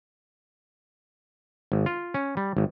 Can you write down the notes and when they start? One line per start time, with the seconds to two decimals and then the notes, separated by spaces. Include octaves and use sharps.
1.72 G#1
1.86 F4
2.14 C#4
2.37 G3
2.57 G#1